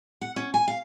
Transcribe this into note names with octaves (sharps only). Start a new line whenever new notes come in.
F#5
C#4
G#5
F5